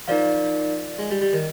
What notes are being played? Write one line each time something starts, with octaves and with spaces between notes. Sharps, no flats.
F3 D#4 A#4 D5 F5
G#3
G3
G3
D#3